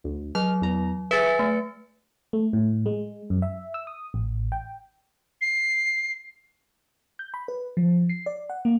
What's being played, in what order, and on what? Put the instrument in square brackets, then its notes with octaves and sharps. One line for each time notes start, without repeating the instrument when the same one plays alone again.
[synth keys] D2
[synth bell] F#3 [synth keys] G#3 F6
[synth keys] E2 A#5
[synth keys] G#4 E5 [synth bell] B4 A6 C#7
[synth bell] A3
[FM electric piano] A3
A2
G#3
F#2
E5
E6
D#6
A1
G5
[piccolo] C7
[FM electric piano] G6
B5
B4
F3
C7
D5
F#5
A#3